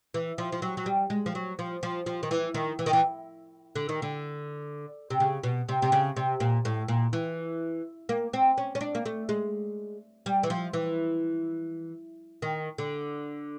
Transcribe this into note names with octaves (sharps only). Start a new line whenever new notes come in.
E3
F3
F3
F#3
F#3
G3
G#3
F3
F#3
F3
F3
F3
D#3
E3
D#3
E3
D#3
E3
D3
D#3
D3
C3
C#3
B2
C3
C3
C#3
C3
A#2
A2
A#2
E3
A#3
C4
C#4
C#4
D4
A#3
A3
G#3
G3
E3
F3
E3
D#3
D3